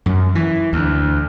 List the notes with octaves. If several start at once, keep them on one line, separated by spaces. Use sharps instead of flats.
F#2
E3
D2